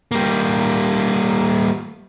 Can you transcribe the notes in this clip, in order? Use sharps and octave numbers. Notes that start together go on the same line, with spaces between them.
G3 A#3